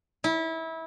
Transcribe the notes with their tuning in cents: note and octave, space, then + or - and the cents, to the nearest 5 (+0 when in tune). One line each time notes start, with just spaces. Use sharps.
E4 -25